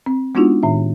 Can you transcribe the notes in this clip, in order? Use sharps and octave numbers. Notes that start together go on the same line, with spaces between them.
C4
G#3 B3 D4 D#4 F4 F#4
A2 D#3 E5